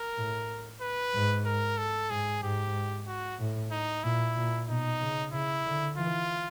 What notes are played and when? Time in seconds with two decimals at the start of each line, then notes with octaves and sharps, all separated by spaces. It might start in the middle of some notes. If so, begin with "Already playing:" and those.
Already playing: A#4
0.17 A2
0.81 B4
1.14 G#2
1.46 A#4
1.78 A4
2.10 G#2 G#4
2.42 G#2 G4
3.07 F#4
3.39 A2
3.71 D#4
4.04 A#2 E4
4.36 A#2
4.68 B2 D#4
5.00 C#3
5.33 C#3 E4
5.65 D3
5.97 E3 F4